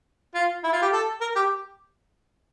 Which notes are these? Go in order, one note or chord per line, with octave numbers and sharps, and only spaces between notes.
F4
E4
F4
G4
A4
A#4
G4